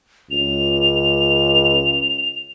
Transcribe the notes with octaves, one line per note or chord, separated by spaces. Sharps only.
C#2 F7